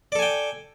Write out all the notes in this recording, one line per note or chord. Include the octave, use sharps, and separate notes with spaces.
A4 D5 G5 G#5